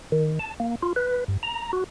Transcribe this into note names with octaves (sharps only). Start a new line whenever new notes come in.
D#3
A5
A#3
F4
B4
G2
A#5
F#4